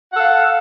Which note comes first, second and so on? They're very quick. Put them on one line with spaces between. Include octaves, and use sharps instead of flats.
F#5 A4 F5